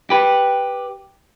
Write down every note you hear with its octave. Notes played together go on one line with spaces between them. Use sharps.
G4 B4